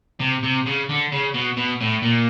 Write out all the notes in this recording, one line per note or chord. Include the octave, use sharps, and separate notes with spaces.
C3
C3
C#3
D3
C#3
B2
B2
A2
A#2